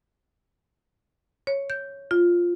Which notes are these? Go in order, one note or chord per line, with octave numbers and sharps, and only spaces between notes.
C#5
G6
F4